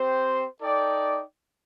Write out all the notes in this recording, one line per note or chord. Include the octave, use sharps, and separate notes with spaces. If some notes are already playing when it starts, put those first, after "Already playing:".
Already playing: C4 G4 C5
D#4 A4 D5 G5